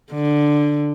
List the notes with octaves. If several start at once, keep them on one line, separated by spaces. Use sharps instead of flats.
D3